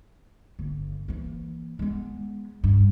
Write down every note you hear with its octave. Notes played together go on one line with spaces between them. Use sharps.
G1
E3 A#3
G#3 B3
G2